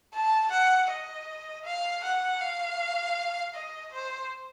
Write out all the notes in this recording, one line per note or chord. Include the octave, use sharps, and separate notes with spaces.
A5
F#5
D#5
F5
F#5
F5
D#5
C5